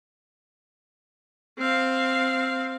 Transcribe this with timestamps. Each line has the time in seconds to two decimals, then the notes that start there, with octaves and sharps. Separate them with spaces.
1.58 C4 F5